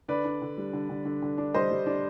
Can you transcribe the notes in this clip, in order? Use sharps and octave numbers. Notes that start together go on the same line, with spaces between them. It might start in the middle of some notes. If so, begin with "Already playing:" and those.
D3 B4 D5
D4
D3
G3
D3
D3
D3
D3
D4
G3 C5 D#5
G3
D4